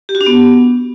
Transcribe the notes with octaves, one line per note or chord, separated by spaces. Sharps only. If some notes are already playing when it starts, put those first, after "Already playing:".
G4
F#4
D4
B3